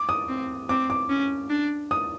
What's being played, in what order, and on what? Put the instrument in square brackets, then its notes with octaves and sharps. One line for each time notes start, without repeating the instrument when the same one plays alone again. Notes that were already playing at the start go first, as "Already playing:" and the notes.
Already playing: [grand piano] D6
D#6
[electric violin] C4
[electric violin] C4 [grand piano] D6
[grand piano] D6
[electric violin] C#4
D4
[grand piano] D#6